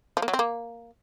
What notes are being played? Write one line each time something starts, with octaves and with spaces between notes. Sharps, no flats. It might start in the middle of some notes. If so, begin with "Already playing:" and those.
F3
A#3
F#3
C4
A#3